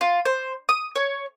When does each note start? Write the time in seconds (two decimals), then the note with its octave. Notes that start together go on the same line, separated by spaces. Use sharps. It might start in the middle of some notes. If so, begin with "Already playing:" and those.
0.01 F4
0.25 C5
0.69 D#6
0.96 C#5